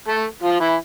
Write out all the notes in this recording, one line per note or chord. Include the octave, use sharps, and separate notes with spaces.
A3 A4
F3 F4
E3 E4